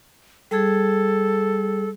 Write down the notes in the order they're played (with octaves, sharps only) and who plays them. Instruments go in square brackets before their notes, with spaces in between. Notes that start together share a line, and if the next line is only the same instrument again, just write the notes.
[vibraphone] G3 G#4 [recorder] A4